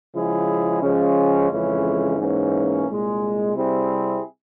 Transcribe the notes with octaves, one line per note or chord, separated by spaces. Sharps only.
C#3 F3 G#3 E4 G#4
C#3 F3 G#3 C#4
F2 C#3 E3 G#3 C#4
G#2 E3 A#3 C#4
C2 A#2 G#3
C3 G3 C4 E4 G#4